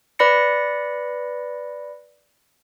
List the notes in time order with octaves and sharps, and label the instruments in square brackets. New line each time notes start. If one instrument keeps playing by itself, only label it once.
[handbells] B4 D5 B5 A#6 C#7